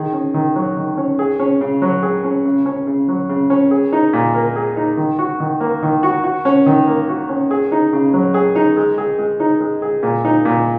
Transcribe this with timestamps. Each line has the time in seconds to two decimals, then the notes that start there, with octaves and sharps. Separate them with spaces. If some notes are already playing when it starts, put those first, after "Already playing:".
Already playing: D#3 G#4
0.13 C#4
0.34 D#3
0.56 F#3
0.77 D#3
0.97 C#4
1.19 G#4
1.40 C#4
1.61 C#3
1.82 F#3
2.03 G#4
2.24 C#4
2.45 C#3
2.66 C#4
2.87 C#3
3.08 F#3
3.29 C#3
3.50 C#4
3.71 G#4
3.93 D#4
4.13 A#2
4.34 A#3
4.56 G#4
4.77 D#4
4.97 D#3
5.19 F#4
5.40 D#3
5.60 A#3
5.83 D#3
6.03 F#4
6.24 F#4
6.45 C#4
6.66 D#3
6.87 A#3
7.08 F#4
7.29 C#4
7.51 G#4
7.72 D#4
7.93 C#3
8.14 F#3
8.34 G#4
8.56 D#4
8.77 G#3
8.98 G#4
9.19 G#3
9.40 D#4
9.60 G#3
9.82 G#4
10.03 A#2
10.25 D#4
10.45 A#2